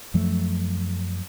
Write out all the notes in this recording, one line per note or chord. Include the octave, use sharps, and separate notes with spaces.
F#2 F3 F#3 A3